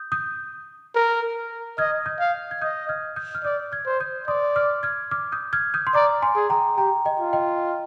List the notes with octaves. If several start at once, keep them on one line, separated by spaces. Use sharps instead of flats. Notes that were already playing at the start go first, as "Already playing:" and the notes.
Already playing: D#6 G6
D#6 G6
A#4
D#5 F6 G#6
D#6 G6
F5
G#6
D#5 D#6 G6
F6 G#6
D#6 G6
F6
D5 D#6 G6
F6 G#6
C5
D#6 G6
D5 C6 D#6
D6 F6
F6 G#6
D6 F6
D#6 G6
F6 G#6
D#6 G6
C6
D5 A#5 D6
G#5 C6
G#4
G5 A#5
G4 G5 A#5
D#5 G5
F4
D#5 G5